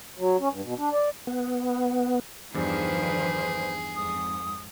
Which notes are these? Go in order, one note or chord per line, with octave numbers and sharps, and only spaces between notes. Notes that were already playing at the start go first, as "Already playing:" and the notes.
F#3
C#4
G2
B2
D4
D5
B3
E2 G2 D#3 F3 D4 G#4 B4 C5
F2 G#2 D#6